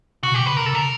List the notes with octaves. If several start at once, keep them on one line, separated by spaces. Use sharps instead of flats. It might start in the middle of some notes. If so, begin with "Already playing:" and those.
C3 F#4
B2 G4
C#3
C3 B4
C3 A#4
C#3 A4
C3 A#4